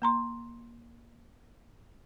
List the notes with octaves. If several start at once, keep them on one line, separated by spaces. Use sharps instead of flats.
A#3 A#5 C6